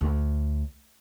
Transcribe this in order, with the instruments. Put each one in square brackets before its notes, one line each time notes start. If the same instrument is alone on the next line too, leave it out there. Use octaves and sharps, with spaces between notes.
[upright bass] D2